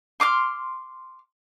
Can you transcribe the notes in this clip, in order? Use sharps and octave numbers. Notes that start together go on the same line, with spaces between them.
C6 D6 D#6 F6